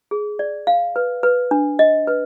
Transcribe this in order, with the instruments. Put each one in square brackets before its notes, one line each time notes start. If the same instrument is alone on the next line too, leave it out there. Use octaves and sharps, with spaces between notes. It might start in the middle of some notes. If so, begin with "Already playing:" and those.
[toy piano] G#4
D5
F5
B4
B4
D4
D#5
B4